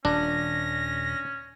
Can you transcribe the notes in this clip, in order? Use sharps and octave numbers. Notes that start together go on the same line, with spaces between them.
D#1 C#4 D4 A#6